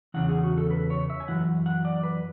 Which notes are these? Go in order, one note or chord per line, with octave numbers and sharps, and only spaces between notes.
E2 C#3 E3 F#5
G#4
F#4
A4
B4
C#5
E5
G#5
F#2 E3 F#5
F#5
D5
B4